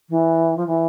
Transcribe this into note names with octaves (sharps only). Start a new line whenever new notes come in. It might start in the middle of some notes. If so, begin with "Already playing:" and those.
E3
F3
E3